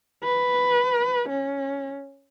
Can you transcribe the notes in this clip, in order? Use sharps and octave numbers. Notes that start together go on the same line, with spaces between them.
B4
C#4